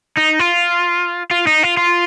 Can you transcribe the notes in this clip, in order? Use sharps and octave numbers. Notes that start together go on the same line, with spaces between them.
D#4
F4
F4
D#4
F4
F4